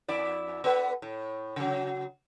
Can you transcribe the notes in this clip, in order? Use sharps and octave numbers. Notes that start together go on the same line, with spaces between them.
F2 E4 D5
B3 A4 B4
A2
C#3 F#3